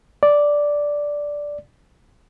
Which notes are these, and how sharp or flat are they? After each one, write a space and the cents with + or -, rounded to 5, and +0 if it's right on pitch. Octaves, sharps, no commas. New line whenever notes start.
D5 -5